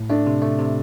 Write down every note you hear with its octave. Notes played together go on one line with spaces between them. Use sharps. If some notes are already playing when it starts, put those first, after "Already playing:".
Already playing: A2
A3 D4
C3
A3
C3